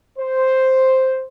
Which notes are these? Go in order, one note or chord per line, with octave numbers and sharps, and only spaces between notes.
C5